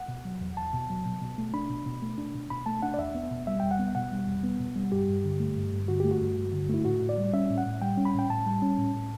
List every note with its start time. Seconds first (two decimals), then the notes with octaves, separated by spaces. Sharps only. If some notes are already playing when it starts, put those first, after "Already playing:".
Already playing: F#5
0.08 B2
0.25 F#3
0.41 E2
0.57 E2 A5
0.73 B2
0.90 F#3
1.06 B2
1.21 B2
1.38 A3
1.54 D4 B5
1.70 B2
1.85 B2
2.02 A3
2.18 D4
2.34 B2
2.50 B2 B5
2.66 A3 A5
2.82 D4 F#5
2.94 D5
2.99 E2 E5
3.14 B3
3.31 B2
3.47 G3 E5
3.60 E2 G5
3.71 F#5
3.79 B3
3.95 B2 F#5
4.12 G3
4.27 E2
4.43 B3
4.60 B2
4.76 G3
4.92 G2 G4
5.08 G2
5.24 D3
5.40 A3
5.56 G2
5.72 G2
5.88 D3 F#4
6.00 A3 G4
6.11 F#4
6.21 G2
6.37 G2
6.53 D3
6.69 A3 E4
6.85 A2 F#4
7.01 A2
7.09 D5
7.18 G3
7.33 C#4 E5
7.49 A2
7.58 F#5
7.66 A2
7.81 G3 G5
7.97 C#4
8.05 B5
8.14 A2 G5
8.30 A2 A5
8.46 G3
8.62 C#4
8.78 A2
8.95 A2